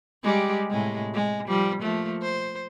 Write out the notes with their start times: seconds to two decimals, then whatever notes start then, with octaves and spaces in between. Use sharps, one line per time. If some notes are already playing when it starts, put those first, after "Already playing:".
0.24 G3 G#3 G4
0.70 A2 C3 G#3
1.14 G#3
1.48 F3 G3
1.81 F3 A3 A#3
2.22 C5